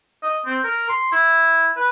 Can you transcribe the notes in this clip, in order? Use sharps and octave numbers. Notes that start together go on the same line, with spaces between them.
D#5
C4
A#4
C6
E4
B4